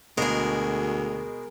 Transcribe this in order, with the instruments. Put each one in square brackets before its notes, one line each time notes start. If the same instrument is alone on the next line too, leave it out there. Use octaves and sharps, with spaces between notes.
[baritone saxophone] D2 [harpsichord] B2 G#3 [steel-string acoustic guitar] G#4 A#4